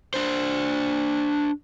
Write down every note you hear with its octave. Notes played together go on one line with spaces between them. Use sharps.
D4 C5